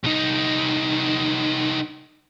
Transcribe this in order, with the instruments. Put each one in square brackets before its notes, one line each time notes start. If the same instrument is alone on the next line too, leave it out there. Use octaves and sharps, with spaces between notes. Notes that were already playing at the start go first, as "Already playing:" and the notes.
[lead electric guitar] C2 D#4